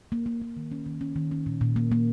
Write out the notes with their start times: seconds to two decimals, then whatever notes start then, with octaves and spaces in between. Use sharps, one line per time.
0.12 A#3
0.26 A#3
0.42 A#3
0.57 D#3
0.72 C#4
0.86 D#3
1.01 C#4
1.16 D#3
1.31 C#4
1.46 A#2
1.61 A#2
1.76 A#3
1.91 A#3